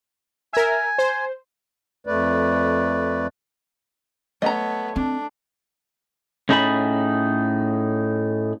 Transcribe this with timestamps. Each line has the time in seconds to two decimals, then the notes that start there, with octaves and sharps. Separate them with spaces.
0.53 A#4 E5 G#5
0.98 C5
2.07 F2 A3 B4 D5
4.42 A3 B3 C#5 D#5 A#5
4.96 C4 D4
6.49 A2 C#4 D#4 G#4 A5 B5